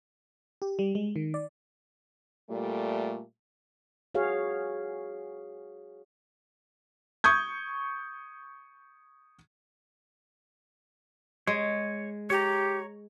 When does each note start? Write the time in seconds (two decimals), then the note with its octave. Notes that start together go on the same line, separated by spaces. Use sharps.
0.62 G4
0.79 G3
0.95 G#3
1.16 D#3
1.34 D5
2.49 A#2 G3 A3
4.15 F#4 G#4 C#5 F5
7.24 C#6 D#6 G6 G#6
11.47 G#3 C#5
12.30 G4 C#5 A#5